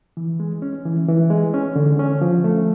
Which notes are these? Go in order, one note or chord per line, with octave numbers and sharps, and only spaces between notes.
E3
G#3
C#4
E3
E3
G#3
C#4
D3
C#4
F3
A3